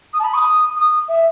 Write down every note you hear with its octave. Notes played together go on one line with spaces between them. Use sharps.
D#6
A5
B5
D#6
D#6
E5